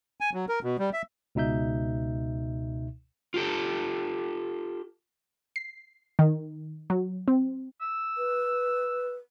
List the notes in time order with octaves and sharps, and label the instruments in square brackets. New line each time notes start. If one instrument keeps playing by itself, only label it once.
[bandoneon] G#5
F#3
A#4
B2
G3
E5
[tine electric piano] C#2 B2 D#4 E5 G6
[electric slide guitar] F4 G4 A4
[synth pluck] C7
D#3
F#3
C4
[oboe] E6
[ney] B4